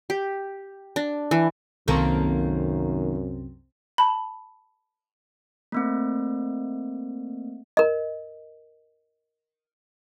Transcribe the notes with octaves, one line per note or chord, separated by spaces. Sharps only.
G4
D4
E3
C2 F#2 C3 D#3 A#3 C4 A4
A5 B5
A3 A#3 C4
A#4 D#5